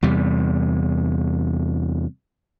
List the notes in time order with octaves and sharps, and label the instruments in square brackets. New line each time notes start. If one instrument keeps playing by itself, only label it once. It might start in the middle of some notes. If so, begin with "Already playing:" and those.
[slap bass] E2 C3 G3